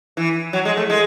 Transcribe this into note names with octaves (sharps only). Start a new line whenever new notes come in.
E3
F#3
G#3
A3
G#3